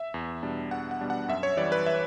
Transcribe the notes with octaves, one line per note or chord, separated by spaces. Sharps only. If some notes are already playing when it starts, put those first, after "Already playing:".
Already playing: E5
E2
B2 G3 D4
E2 F#5
F#5
B2 G3 D4
F#5
F#2 E5
C#5
E3 G3 D5
B4
E5